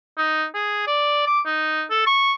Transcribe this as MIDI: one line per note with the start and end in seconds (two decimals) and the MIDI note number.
0.18 0.45 63
0.54 0.86 68
0.87 1.23 74
1.27 1.40 86
1.46 1.84 63
1.90 2.05 69
2.07 2.34 85